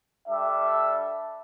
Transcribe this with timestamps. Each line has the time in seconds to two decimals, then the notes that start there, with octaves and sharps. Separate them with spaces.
0.27 G3 D4 A4 E5